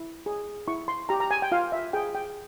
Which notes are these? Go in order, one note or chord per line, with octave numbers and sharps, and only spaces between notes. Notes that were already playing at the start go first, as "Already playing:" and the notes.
Already playing: E4
G#4
E4 C#6
C6
G4 A#5
A#5
G#5
G5
F4 F5
E5
G#4 G5
G5